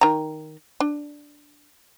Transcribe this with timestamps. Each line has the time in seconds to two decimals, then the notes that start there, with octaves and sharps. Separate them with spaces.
0.01 D#3 A#5
0.80 D4